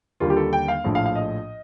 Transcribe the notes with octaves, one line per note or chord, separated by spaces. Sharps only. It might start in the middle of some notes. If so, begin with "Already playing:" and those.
D#2 D3 G3 A#3 F4
G4
A4
G5
F5
A#1 A2 F3
F5
F5
D#5